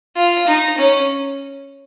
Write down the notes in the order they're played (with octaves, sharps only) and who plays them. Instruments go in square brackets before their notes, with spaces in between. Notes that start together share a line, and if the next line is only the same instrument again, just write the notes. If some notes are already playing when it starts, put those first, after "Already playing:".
[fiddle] F4
D#4
C#4